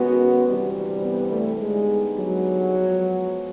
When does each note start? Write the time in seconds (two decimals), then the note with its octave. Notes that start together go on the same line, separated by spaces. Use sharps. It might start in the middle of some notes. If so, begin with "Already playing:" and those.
Already playing: D#3 G#3 B3 C#4 F#4
0.43 D2 C3 E3 G3
1.02 B3
1.32 A3
1.61 D3 G3 G#3 B3 D#4 G#4
2.19 F#3
2.77 F3 G#3 B3